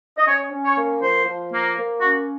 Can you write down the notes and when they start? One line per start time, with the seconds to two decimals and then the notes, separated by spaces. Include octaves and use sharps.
0.16 D#5
0.26 C#4 C#5
0.51 C#4
0.64 C#5
0.76 A#3
1.01 F3 C5
1.25 F3
1.51 A#3
1.76 A#3
2.00 C#4 F#4